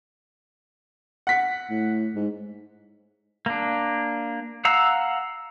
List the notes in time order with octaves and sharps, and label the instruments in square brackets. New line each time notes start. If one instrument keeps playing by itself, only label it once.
[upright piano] F#5 B6
[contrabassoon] A2
G#2
[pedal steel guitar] A#3 D4
F5 F#5 A#5 E6